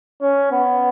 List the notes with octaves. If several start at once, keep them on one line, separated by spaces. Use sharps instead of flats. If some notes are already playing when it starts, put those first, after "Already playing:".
C#4
B3